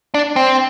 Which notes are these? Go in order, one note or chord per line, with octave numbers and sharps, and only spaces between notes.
D4
C4